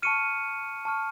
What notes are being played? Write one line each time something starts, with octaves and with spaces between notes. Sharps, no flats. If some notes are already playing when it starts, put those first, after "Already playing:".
A5 C#6 F6 C#7 D#7
A5 C#6 F6